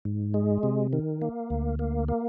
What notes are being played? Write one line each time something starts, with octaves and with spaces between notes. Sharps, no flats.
G#2
G#3
C3
D#3
A#3
D2
A#3
A#3